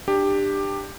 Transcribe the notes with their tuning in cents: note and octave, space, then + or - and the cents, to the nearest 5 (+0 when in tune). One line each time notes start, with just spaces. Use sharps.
D4 +20 G4 +10